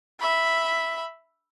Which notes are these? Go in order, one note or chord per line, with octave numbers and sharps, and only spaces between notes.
E5 B5